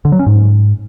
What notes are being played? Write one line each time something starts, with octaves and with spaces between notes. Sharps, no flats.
D3
F#3
C#4
G#2